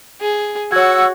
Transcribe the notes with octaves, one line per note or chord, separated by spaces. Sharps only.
G#4
F#4 C#5 F#5 C#6 E6 G#6